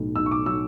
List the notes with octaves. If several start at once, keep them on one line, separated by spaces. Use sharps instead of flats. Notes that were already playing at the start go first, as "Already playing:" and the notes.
Already playing: B1 A2
B1 E6
C#6
D6
F#3 E6